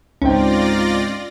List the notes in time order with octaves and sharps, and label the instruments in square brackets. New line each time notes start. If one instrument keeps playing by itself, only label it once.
[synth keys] C#2 [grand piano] G#2 C4 G5 [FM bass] C#4 [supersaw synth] F4 D5 A#6